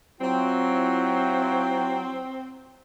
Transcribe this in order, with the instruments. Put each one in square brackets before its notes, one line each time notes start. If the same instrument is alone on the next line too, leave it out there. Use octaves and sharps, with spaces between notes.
[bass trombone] F#3 [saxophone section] C4 [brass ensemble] E4 F4 G5